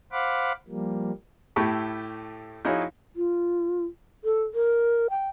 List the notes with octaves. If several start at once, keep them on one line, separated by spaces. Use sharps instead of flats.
C5 F5 F#5 B5 D6
F3 G3 A#3
A2 A3 E4 G4 A5 C#6
F3 D#4 E4 F#4 G#4 C#5
F4
A4
A#4
G5